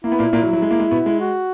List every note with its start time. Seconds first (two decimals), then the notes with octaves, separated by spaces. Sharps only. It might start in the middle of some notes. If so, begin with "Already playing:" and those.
0.04 A#3 E4
0.12 B3
0.19 A#2 A#3
0.33 A#2 A#3
0.42 F#3
0.53 F#3
0.62 G#3
0.71 A#3
0.79 G#3
0.91 B2 B3
1.06 G#3
1.21 F#4